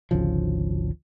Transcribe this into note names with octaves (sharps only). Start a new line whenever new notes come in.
G#1 D2 C#3 F3